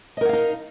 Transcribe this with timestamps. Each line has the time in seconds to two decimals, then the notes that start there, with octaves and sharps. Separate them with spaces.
0.17 D#5
0.21 A#4
0.25 F#5
0.29 F5
0.33 D#4